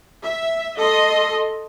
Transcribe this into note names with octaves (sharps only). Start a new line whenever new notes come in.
E5
A4 D#5 C6